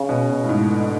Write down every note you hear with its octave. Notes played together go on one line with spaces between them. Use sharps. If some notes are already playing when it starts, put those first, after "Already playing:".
Already playing: C#3
B2
B2
A2
G#2
D3